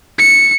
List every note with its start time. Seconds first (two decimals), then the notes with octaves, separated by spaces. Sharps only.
0.19 C#7